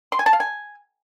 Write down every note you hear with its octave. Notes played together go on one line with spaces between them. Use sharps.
C6
G#5
A5
F5
G#5